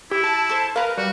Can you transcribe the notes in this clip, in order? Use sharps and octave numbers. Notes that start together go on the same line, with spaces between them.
E4 G4
A5
A4 C5
A#4 B4 F5
G3 F#4